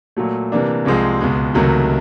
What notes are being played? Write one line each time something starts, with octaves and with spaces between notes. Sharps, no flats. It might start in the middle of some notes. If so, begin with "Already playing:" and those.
A#2 F#3 A3
C3 E3 G3 A#3 D4
C2 C3 F3 G#3 C4
C#2 B2 G#3
C#2 C3 D#3 F#3 A3